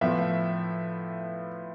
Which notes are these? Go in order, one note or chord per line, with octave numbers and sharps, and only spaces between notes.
A2 F3 B3 E5